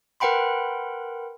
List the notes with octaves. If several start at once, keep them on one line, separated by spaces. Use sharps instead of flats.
A#4 B4 F#5 G5 B5 C6